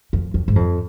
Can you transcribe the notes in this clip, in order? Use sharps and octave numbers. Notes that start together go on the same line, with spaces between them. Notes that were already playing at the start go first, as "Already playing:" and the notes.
F2
F2
G#2
F2